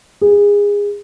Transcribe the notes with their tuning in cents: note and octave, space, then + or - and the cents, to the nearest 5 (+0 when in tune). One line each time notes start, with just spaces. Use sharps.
G#4 -25